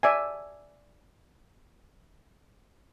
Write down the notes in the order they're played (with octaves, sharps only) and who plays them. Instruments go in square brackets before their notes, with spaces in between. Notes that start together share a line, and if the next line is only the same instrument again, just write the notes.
[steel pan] D5 E5 G#5